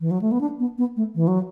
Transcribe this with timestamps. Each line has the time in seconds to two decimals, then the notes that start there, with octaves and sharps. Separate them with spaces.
0.01 E3
0.11 F#3
0.22 A3
0.32 B3
0.41 D4
0.59 B3
0.78 B3
0.97 A3
1.15 E3
1.28 F#3